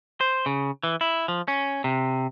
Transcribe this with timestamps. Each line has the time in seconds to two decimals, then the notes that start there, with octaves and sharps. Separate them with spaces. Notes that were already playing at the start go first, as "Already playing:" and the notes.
0.21 C5
0.46 C#3
0.83 E3
1.01 E4
1.28 F3
1.48 C#4
1.84 C3